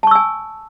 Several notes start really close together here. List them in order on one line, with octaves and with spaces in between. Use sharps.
A5 C#6 E6 G#5